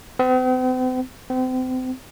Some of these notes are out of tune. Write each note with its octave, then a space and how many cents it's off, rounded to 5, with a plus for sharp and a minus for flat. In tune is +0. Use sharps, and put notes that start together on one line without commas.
C4 -45
C4 -35